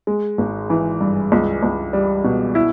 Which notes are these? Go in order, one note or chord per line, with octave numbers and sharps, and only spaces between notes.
G#3
G#1
E3
G2
C#2
C#2
G3
B2
E4